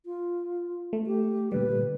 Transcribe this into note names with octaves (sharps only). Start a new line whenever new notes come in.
F4
A3
G4
A#2 D3 G3 B4